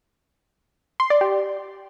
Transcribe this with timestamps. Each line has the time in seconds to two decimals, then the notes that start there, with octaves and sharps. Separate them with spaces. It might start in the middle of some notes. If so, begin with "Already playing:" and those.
1.00 C6
1.10 D5
1.21 G4